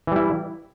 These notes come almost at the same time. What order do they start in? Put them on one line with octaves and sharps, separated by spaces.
E3 G3 E4